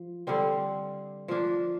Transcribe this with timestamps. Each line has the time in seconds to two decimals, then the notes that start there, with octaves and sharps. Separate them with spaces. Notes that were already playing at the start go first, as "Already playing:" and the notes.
Already playing: F3
0.27 D3 G3 C4
1.28 F3 A#3 D4